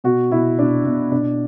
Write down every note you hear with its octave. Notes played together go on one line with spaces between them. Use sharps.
B2 F#4
B2 E4
B2 D4
B2
B2 D4